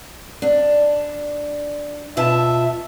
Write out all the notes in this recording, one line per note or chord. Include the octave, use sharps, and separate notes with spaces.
D4
B2 F4 E5 A5